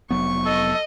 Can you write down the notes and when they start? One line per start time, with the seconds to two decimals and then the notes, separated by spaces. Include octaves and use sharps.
0.11 F1 F#3 B3 C#6
0.45 A4 D#5